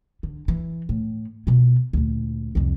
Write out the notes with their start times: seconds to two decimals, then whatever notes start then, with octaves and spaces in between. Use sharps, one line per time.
0.23 D3
0.48 E3
0.89 A2
1.47 B2 F4
1.93 D2 A#2
2.55 C2 F2